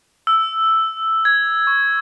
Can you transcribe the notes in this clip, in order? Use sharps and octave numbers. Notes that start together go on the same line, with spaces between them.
E6
G#6
C#6